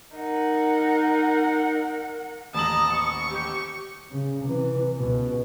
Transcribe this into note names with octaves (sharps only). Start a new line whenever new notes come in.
D#4 A#4 F#5
D#1 A1 A5 A#5 D#6 F#7
C#6
G4
C#3
C3 E3
C#2 B2